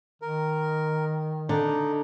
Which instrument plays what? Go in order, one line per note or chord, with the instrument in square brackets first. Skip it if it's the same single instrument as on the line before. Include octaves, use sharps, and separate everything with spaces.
[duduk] D#3 [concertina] A#4
[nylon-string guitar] D3 [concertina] D#4